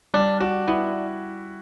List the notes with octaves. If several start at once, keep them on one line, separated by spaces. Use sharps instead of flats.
G3 D4
D4 F#4
B3 E4